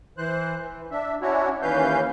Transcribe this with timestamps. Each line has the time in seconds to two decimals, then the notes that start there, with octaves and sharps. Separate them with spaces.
0.17 E3 C5 F#6
0.59 E3
0.91 D4 E5
1.22 C#4 D4 E4 F#4 C#5
1.62 D#2 E3 C#4 B4 F5 G6